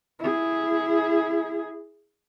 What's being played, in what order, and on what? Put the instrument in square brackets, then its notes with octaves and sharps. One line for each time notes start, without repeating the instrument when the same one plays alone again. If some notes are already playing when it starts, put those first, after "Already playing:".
[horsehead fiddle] E4 G#4